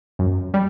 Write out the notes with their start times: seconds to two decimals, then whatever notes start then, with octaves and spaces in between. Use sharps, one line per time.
0.19 F#2
0.54 G3